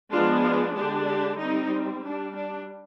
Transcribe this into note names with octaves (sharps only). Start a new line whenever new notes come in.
F3 G#3 B3 D4 F4
F4
D3 G#3 D4 G4
G4
G3 C4 D#4
G3 D4
D4